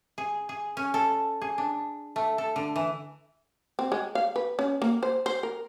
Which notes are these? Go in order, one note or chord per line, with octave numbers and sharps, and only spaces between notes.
G#4
G#4
C#4
A4
G#4
D4
A3
A4
D3
E3
C4
G#3
F5
B4
C#4
A#3
C5
C5
A#4